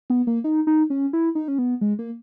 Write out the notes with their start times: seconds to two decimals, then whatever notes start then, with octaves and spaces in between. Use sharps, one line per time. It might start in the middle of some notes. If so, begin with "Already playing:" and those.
0.10 B3
0.27 A#3
0.44 D#4
0.67 D#4
0.90 C#4
1.13 E4
1.35 D#4
1.48 C#4
1.58 B3
1.81 G#3
1.99 A#3